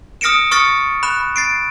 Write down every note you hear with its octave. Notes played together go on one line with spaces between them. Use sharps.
D#6 F6 A#6 C#7 D7 E7
C#6 D#6 F6 A6 A#6 C#7
B5 F#6 E7
A6 C7 D7